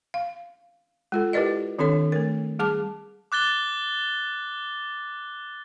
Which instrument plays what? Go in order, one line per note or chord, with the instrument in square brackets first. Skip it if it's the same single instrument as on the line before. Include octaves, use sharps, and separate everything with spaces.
[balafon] F5
G#3 F4 A4
E4 G4 A#4 B4 D5 D#5
D#3 C4 D4 A4 C#5
A3 A#4
G3 G#4 A5 D6
[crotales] D6 F#6 A6 G7